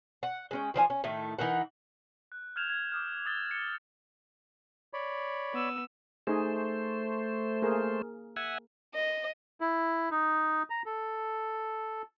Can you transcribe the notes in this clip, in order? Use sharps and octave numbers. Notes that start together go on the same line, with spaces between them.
F#5
G#3 C#4 G5
D#3 F3 D5 G#5
C#4
A2 D#3 A3
E3 D#4 A#4 F#5
F#6
F6 G6 G#6 E7 F7
G#6
D6 D#6 F6
D#6 E6 A6 F7 G7
C#7
C#5 D5 B5
B3 E6
A3 D#4 G#4 C5
A#3 G#4 A#4
E5 F#5 G#5
D#5
E4
D#4
A#5
A4